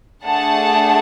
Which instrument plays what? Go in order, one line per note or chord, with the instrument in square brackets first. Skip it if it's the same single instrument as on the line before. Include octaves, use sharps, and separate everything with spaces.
[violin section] A3 D4 G#4 F#5 A5